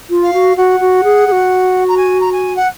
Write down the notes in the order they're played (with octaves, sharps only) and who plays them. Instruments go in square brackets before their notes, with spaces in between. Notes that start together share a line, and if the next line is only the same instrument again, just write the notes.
[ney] F4
[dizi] F5
[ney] F#4
[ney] F#4 [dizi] F#5
[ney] F#4
G#4
G#4
F#4
[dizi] A#5
G#5
A#5
G#5
F#5